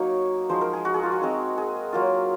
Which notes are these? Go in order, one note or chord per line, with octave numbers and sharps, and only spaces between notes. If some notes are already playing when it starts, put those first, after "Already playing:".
Already playing: F#3 A#3 D#4 C#5
F3 G#3 D#4 C5
A#4
G#4
F#4
G#4
F4
F#4
G#3 C4 D#4
G#4
F#3 A#3 F4